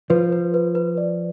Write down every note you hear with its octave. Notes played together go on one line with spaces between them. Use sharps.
F3 B4
B4
B4
B4
D5